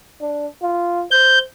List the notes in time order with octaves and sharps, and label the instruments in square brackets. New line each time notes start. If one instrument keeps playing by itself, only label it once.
[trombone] D4
F4
[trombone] C5 [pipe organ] G6